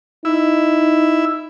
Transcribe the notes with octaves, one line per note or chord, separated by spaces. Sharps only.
D#4 E4